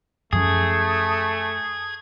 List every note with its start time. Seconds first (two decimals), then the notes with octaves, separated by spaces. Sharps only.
0.33 F#2 F3 A3 C#4 G#4 G#6